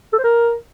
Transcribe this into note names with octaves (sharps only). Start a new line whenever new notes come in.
A4
C5
A#4